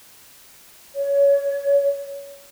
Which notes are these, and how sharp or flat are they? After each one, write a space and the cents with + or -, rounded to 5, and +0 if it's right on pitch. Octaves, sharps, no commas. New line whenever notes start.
C#5 +20